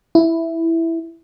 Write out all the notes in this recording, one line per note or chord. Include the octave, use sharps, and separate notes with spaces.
E4